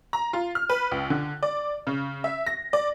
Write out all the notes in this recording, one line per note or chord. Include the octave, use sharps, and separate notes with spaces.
A#5
F4
F6
B4
C#2
D3
D5
C#3
E5
A#6
D5